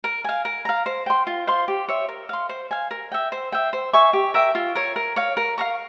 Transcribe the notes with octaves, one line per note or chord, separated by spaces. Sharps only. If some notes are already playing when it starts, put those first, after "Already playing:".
A#4
F5 G#5
A#4
F5 A#5
C5
G5 C6
F4
C5 F5 C6
G4
C#5 E5
A#4
F5 C6
C5
F5 G#5
A#4
E5 G5
C5
E5 G5
C5
E5 G#5 C#6
G4
A#4 E5 G5
F4
A#4 C#5
A#4
C#5 F5
A#4
F5 A#5 C#6